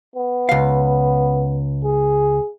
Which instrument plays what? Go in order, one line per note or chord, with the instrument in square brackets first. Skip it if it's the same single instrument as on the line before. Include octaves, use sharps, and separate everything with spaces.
[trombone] B3
[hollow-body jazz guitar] C#2 F5
[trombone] G#4